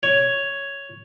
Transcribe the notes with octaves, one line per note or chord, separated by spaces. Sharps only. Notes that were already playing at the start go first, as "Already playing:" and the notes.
C#5